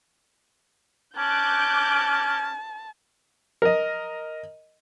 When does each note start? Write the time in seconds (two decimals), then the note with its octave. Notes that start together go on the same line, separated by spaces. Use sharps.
1.18 C#4 A5 D6 F#6 G6
3.62 A#4 D#5